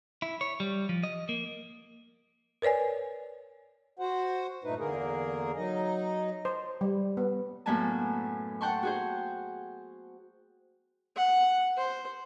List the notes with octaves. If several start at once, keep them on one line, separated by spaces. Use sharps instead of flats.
E4
C#5
G3
F3
D#5
A#3
A#4 B4 C#5 D5 G#5
F#4 C5 F#5
G2 A#2 A3 D#4 B4
E2 D3 A#3 G#4 A#4
F#3 D#4 D#5
C5
G3
B3
F#2 A2 A#3 B3 G#5 A5
F#5 G5 A5 C6 C#6
F#4 G#4 C5
F#5
C5